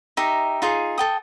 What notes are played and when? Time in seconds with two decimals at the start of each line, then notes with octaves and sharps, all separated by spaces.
0.17 D#4 G4 E5 A#5
0.62 D#4 F4 G#4
0.98 A4 G5 D#6